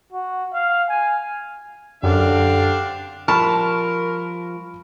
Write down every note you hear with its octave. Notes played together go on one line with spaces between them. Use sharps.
F#4
F5
G#5
F#2 D3 C4 D4 G4 F5
F3 G3 A#4 A5 B5 C#6 F6